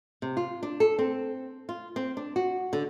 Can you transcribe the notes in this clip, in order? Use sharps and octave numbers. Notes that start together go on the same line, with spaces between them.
C3
F4
D4
A4
C4
F4
C4
D4
F#4
D3